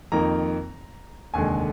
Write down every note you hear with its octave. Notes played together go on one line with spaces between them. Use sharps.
F2 D#3 A#3 D#4 A#5
F1 D#2 D3 G#3 G#5